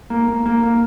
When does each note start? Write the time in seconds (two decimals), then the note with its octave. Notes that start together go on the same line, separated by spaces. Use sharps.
0.10 A#3
0.28 A#3
0.46 A#3
0.63 A#3